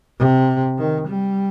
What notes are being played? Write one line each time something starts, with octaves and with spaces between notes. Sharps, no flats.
C3
D#3
G3